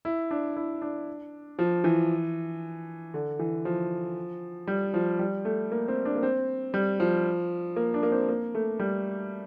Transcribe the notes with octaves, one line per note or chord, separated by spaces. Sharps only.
E4
D4
E4
D4
F3
E3
D3
E3
F3
G3
F3
G3
A3
A#3
C4
D4
A#3
C4
G3
F3
A#3
D4
A#3
C4
A#3
A3
G3